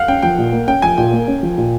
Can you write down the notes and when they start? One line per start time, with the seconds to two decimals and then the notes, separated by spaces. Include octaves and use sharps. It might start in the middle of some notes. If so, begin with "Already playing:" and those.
Already playing: F5 F#5
0.08 C#4 G5
0.22 F3 G5
0.38 A#2
0.53 A#3
0.68 C#4 G5
0.82 F3 G#5
0.98 A#2 G5
1.13 A#3
1.28 C#4
1.43 F3
1.58 A#2